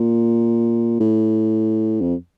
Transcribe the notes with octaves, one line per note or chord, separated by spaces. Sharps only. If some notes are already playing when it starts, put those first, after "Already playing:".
Already playing: A#2
A2
F2